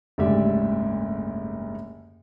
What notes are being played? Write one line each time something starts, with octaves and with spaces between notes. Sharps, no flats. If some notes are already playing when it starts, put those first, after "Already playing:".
F#1 D2 G#2 G4 D5 E5